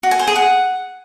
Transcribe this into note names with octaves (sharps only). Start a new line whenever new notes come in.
F#4
G#5
C5
G#4
F#5